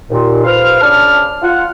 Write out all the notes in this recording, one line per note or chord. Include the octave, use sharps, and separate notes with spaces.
D#2 A#2
F4 B4 C5 F5 F6
C#3 D4 A5 F6
F4 F#5